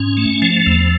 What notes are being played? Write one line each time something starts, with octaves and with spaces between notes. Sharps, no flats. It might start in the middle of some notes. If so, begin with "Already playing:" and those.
Already playing: G#2 C#4
A3
F3
E2